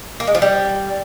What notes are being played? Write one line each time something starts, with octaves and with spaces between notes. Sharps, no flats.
A#3
G#3
F3
G3